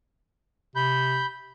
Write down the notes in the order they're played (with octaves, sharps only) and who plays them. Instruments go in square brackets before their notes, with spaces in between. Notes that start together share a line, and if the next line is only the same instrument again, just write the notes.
[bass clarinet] C3 [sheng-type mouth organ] B5 G6